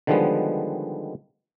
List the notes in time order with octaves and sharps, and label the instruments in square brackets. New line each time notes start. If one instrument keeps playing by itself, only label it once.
[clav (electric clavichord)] D3 D#3 F3 G3 G#3 B3